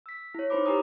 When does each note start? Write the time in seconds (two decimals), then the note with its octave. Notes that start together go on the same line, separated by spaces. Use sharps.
0.06 E6 B6
0.35 E4 C#5
0.50 D#4 E4 C5 B5 D6
0.66 G4 B4 G#5 A#5 D#6